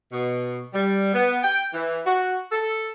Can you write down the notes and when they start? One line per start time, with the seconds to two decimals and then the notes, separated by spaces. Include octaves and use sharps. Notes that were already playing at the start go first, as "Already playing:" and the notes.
0.12 B2
0.73 G3
1.13 B3
1.43 G5
1.73 E3
2.06 F#4
2.52 A4